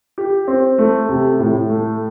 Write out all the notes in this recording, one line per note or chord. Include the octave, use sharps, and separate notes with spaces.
G4
C4
A3
C3
A2
A3